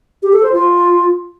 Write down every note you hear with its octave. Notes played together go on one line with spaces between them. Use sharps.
G4
A4
C5
F4